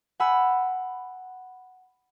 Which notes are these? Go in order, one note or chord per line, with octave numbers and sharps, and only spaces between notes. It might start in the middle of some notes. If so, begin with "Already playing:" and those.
F#5 G#5 B5 E6